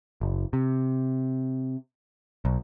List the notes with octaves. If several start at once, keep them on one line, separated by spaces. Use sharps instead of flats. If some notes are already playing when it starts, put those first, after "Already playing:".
F#1
C3
B1